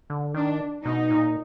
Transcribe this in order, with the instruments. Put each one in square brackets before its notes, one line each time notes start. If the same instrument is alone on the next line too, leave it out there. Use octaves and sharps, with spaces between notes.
[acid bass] D3
[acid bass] D#3 [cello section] D4
[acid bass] B2 [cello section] D#4
[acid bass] A#2